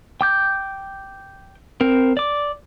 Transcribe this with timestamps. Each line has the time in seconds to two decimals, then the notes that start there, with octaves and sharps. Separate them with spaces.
0.21 G5 D6 G6
1.81 C4 A#4
2.17 D5 D6